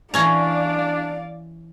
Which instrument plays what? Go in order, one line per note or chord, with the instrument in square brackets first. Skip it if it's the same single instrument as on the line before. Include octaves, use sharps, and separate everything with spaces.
[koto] E3 C#4 A#5 [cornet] D4 [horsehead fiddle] D5 F5